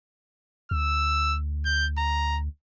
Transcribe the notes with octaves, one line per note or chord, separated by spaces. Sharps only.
D2 E6
G6
A#5